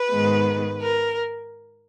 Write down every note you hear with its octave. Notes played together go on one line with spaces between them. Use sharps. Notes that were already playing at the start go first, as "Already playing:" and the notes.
Already playing: B4
G#2 D#3 G#3 B3
A#4